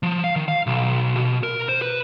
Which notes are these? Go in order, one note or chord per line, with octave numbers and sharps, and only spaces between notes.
F3
F5
D#3
F5
B1
B2
A#4
C5
B4